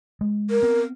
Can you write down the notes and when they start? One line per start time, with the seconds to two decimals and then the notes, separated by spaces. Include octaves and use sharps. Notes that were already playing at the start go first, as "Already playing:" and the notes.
0.21 G#3
0.50 A#4
0.63 B3 C4